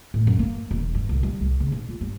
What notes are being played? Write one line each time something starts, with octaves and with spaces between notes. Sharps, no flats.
A2
F#2
A#3
E1
G2
C2
G3
C2
C#3
B1
F4
G2